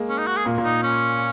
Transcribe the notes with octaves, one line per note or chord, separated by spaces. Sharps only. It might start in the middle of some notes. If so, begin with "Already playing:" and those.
Already playing: G#3 A#3
C#4
D#4
F#4
G#4
A#2 A#3
A#2 A#3
D#4
C#4